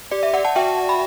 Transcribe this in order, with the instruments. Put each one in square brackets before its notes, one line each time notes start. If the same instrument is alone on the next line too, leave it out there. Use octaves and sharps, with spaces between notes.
[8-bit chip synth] G4 [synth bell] D5
[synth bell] E5
D5 F#5
F#5 A5
[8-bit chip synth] F#4 [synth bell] E5 G5
[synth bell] B5